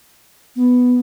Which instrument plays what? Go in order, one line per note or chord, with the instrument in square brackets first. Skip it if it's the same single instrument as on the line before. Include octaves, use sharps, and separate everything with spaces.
[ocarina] B3